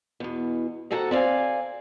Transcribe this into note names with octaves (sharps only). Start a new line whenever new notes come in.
E2 B2
D#2 C3 F#4 A4 F#5 A#5
C4 D5 E5 F5 G#5